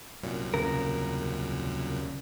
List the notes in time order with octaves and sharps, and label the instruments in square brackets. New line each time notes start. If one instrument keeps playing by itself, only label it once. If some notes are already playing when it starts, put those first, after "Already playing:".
[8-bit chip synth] C2 F#2 A#2
[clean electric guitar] D#2 C#3 A#4